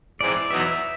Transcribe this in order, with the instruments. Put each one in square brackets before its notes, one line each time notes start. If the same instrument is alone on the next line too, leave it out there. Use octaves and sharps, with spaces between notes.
[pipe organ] G#2 E3 G#3 C4 [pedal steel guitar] D5
[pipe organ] E2 B2 F#3 B3 D#4 [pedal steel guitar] E5